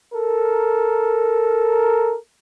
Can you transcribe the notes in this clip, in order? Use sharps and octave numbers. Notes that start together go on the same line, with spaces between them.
A4 A#4